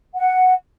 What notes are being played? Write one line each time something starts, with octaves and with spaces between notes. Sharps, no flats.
F#5